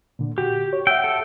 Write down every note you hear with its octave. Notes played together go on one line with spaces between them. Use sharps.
A#2 D3
F#4 G4
C#5
E5 F#5 G5 E6
A4